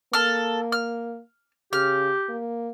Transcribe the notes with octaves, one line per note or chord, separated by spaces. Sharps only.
A#3 A4 F6
F6
C#3 G4 F6
A#3